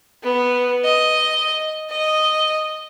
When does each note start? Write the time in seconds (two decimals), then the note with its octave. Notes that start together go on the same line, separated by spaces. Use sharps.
0.23 B3
0.84 D#5
1.90 D#5